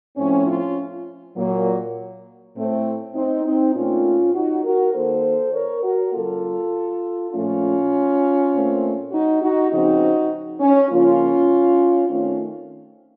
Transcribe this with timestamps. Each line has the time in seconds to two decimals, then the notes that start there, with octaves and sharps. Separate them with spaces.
0.17 A2 F3 C4 C#4
0.47 C#4 F4
1.36 A#2 F#3 A#3
2.55 A2 A3 C4
3.14 C4 D#4
3.44 C4 D#4
3.75 A#2 A3 C4 C#4 F4
4.34 D#4 F#4
4.64 F#4 A#4
4.93 D#3 A#3 A4 C5
5.53 A#4 C#5
5.83 F#4 A#4
6.13 C#3 F#3 A#3 F4 A4
7.31 A#2 F3 A3 C#4 F4
8.51 A#2 A3 C4
9.11 D#4 F#4
9.41 D#4 F#4
9.70 C#3 F3 C4 D#4 F#4
10.60 C#4
10.89 C#3 F3 A#3 C#4 F4
12.08 D#3 A3 C4 C#4 F4